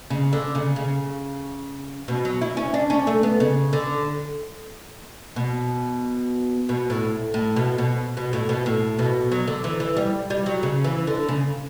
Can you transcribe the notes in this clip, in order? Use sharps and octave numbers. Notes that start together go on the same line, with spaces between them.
C#3
D3
C#3
C#3
B2
F#3
E4
C#4
D4
C#4
A3
B3
C#3
D3
B2
B2
A2
A2
B2
B2
B2
A2
B2
A2
B2
F#3
D3
E3
E3
G3
G3
F#3
C#3
E3
D3
C#3